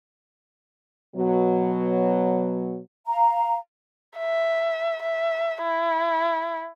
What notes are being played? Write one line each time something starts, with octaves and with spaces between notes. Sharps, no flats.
B2 F#3
F5 A#5
E5
E5
E4